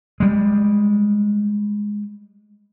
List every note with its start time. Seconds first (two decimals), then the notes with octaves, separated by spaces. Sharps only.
0.20 G3 G#3